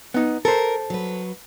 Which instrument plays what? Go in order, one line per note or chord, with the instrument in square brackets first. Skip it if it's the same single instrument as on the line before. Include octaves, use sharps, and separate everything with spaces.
[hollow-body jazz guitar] B3 D#4
[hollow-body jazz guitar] A4 C5 [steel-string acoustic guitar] A#4
[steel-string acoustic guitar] F#3 B4